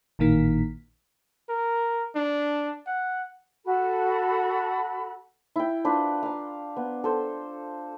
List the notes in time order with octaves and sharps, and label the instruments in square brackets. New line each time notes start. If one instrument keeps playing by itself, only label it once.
[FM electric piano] A1 A#2 D#3 A#3 B6
[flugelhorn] A#4
D4
F#5
[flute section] F#4 A4 A5 B5
[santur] E4 G5
D4 F4 B4
F5 A#5
B3
A4 C5